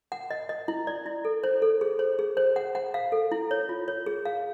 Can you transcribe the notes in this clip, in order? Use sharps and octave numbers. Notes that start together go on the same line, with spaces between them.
F#5
D#5
D#5
E4
D5
E4
A4
C5
A4
G#4
C5
G#4
C5
F#5
F#5
F5
A4
E4
C#5
F4
C#5
G#4
F5